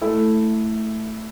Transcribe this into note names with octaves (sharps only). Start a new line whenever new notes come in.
A3 E4 A4